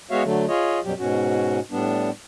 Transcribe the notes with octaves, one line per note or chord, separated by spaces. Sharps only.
G#3 B3 F#4 C#5 E5 F5
D3 F#3 A3
F4 G#4 C#5 D#5
F#2 B2 F#3 G3 G4
G#2 B2 C#4 F#4
A2 G3 B3 D4